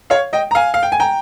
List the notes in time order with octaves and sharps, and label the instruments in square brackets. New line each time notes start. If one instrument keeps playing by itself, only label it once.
[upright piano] C#5 F5
D#5 G5
A#5
F5 G#5
F5
G5
G#5
G5 A#5